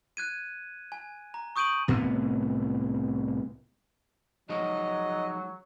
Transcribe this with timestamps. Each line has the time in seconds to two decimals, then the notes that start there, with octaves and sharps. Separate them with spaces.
0.17 F#6 G#6 D#7
0.92 G#5
1.34 A#5
1.56 C#6 D#6 G6 D7 D#7 F#7
1.88 C2 A2 C3 B3
4.49 F3 F#3 G#3 D#4 D#5